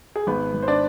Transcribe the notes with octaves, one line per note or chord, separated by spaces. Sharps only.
G#4
G#1 B3 B4
G#1
C5
D4 D5